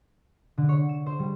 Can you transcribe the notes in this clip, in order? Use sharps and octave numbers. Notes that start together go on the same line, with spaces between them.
D3
C#5
E7
C5
G3